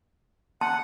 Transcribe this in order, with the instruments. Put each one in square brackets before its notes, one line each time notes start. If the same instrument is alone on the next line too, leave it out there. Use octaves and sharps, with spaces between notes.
[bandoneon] F#5 [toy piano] A5